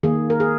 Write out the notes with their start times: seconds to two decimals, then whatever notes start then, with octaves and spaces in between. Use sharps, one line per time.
0.03 D#3 A#3 G#4
0.30 A#4
0.40 G#4